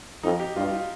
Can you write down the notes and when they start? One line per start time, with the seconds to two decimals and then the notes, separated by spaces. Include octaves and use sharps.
0.23 F2 D#4
0.40 G4
0.56 G2 F4
0.72 F4